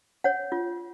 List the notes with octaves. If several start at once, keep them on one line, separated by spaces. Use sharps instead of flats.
C#5 F#5
F4